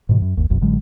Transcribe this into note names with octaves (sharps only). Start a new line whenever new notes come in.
G#2 B2 E3
F#2
G1 D#2
F#1 B1 F#2
A1 D3 F#3 G#3